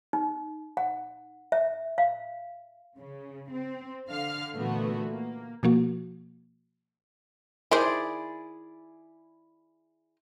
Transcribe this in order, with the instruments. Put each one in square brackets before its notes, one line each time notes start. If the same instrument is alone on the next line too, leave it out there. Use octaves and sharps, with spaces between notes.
[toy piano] D#4
F#5
E5
F5
[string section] C#3
C4
D3 F5 F6
A#2 D3 E3 A3 B3 F#4
A#3
[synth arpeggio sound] B2 F3 A#3 F#4
[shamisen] D#3 A#4 C5 [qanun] E4 G#4 D5